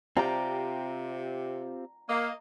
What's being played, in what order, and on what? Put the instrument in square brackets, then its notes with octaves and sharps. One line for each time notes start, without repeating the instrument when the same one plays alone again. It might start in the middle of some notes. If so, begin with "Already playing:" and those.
[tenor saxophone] C3 [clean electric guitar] C4 F4 G4 [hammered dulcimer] A#5
[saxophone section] A#3 [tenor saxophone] D#5